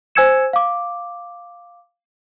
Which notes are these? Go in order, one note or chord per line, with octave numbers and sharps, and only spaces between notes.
C5 G#5 E6 G#6 C#7 E7
F5 D6